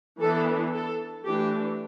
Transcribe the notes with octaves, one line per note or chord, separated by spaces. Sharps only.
E3 B3 D4 A4
A4
E3 A3 D4 G4